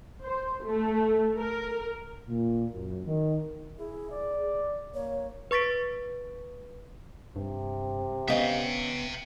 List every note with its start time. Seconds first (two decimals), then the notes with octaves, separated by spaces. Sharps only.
0.23 C5
0.64 A3
1.37 A#4
2.29 A#2
2.73 F#2
3.06 D#3
3.79 E4 G#4
4.11 D5
4.94 A#3 C#5
5.51 B4 C#6 A6 B6 D7
7.36 G2 C3
8.28 C#3 B3 D#5 E5 G5